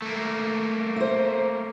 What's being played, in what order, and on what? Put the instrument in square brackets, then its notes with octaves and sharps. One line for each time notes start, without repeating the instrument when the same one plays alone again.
[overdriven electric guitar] A3 A#3
[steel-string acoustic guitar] C5 E5